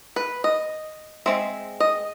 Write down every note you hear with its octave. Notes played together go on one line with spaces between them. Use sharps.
B4
D#5
G#3 C4 E5
D#5